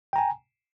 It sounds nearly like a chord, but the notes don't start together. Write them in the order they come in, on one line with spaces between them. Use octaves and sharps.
G5 A#5 G#5